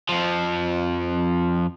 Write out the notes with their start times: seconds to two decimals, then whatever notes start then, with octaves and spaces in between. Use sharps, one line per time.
0.09 F2 F3